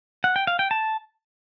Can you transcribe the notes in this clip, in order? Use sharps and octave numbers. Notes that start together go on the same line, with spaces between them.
F#5
G5
F5
G5
A5